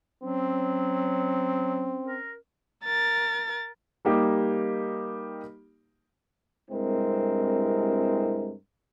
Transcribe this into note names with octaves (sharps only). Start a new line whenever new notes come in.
F#3 C4 C#4
A#4
A#4 A6
G3 A#3 D#4 G4
C2 G2 G#3 C4 E4 A#4